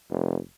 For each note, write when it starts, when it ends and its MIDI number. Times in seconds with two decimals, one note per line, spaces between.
0.10 0.37 29